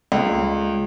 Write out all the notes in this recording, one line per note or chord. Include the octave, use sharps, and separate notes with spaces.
C#2